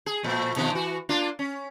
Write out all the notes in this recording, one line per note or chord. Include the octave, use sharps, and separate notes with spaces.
G#4
A#2 F3 A3
B2 D#3 F3
E3 F#4
A#3 D4 F4
C#4